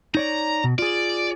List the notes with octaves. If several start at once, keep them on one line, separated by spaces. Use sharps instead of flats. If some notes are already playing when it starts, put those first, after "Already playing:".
D#4 C#5 D5 A#5
B2
F4 G#4 D5